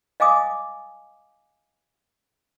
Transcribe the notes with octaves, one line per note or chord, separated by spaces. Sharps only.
D#5 F5 G#5 D6 D#6